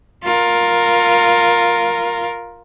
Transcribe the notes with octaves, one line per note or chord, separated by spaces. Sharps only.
F4 A#4